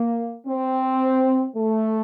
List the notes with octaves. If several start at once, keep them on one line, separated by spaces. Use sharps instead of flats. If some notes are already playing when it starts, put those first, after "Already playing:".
Already playing: A#3
C4
A3